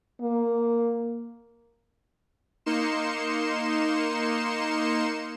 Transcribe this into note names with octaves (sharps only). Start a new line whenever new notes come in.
A#3
A#3 D#4 C6 C#7 E7